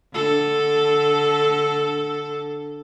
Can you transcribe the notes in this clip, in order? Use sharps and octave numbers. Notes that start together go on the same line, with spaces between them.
D3 A4